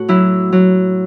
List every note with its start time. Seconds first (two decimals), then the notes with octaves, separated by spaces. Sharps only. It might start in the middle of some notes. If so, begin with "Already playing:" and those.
Already playing: A2 F#4
0.08 F#3 E4
0.52 F#3